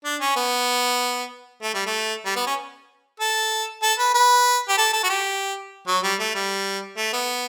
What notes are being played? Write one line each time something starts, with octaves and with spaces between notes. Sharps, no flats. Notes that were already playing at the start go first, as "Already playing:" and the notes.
D4
C#4
B3
A3
G3
A3
G3
B3
C#4
A4
A4
B4
B4
G4
A4
A4
F#4
G4
F#3
G3
A3
G3
A3
B3